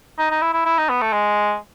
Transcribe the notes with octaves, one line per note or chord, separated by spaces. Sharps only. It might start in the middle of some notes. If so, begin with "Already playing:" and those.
D#4
D#4
E4
E4
E4
D#4
B3
A3
G#3